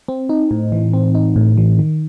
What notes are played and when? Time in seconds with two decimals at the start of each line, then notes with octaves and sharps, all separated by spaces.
0.08 C4
0.29 D#4
0.51 A2
0.72 E3
0.93 C4
1.15 D#4
1.36 A2
1.57 E3
1.79 D#3